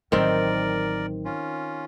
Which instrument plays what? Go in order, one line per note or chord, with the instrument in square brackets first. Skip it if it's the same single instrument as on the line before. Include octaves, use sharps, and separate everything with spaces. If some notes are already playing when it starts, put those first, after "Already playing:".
[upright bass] A1 F#3 [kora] D#3 C4 [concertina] A#4 D5
[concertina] C#4 F4